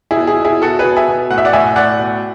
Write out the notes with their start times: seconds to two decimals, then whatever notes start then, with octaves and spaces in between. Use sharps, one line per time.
0.11 E4 G#4
0.16 B2
0.27 E4 G#4
0.39 B2
0.45 E4 G#4
0.62 B2 F#4 A4
0.79 G#4 B4
0.85 B2
0.96 E5 G#5
1.08 B2
1.30 A2 F#5
1.38 E5
1.45 D5 F#5
1.53 A2 E5 G#5
1.76 A2 D5 F#5
1.99 B2